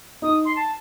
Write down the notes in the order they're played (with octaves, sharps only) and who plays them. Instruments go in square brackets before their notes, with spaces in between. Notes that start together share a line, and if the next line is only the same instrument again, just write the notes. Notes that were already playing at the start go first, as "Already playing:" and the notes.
[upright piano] D#4 [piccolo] D#6
[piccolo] C6
A5